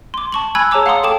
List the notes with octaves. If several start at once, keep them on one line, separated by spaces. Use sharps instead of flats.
C6 D6
A5 C#6 F#7
G#5 B5 E6 F#6 G#6
G#4 C#5 A5 A#5 D6 E6
F5 F#5 A#5 C6 D#6
A4 G5 A5 D6 E7